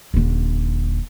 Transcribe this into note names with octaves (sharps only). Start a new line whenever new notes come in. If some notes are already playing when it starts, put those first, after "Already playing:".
D#1 D3